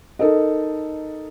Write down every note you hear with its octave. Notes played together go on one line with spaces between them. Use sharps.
D#4 A4 A#4 D#5